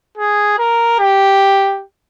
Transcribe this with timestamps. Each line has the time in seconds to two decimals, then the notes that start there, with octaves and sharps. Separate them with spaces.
0.17 G#4
0.58 A#4
1.00 G4